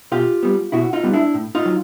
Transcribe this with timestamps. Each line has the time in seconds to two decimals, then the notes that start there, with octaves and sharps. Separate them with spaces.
0.12 B2 F4 G4
0.43 G3 B3
0.72 B2 E4 F#4
0.93 D#4 F4
1.03 G3 B3
1.13 D4 E4
1.34 A2
1.55 D#4 F4
1.65 F#3